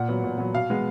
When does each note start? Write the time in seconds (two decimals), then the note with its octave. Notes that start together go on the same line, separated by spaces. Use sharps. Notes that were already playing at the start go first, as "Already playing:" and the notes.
Already playing: A#2 F#5
0.09 F#3 B3
0.24 A#2
0.38 F#3 B3
0.54 B2 F5
0.70 G#3 B3